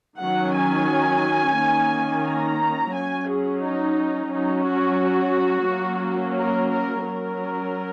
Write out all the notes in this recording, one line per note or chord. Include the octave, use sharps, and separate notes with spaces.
D#3 F#3 C#4 F#5
G#5
D#3 A#3 C#4
A#5
F#3 C#4 G#5
G#4
D#4
F#3 C#4 D#4
F#4
F#3 A#3 C#4
A#4
A#4
F#3 C#4 A#4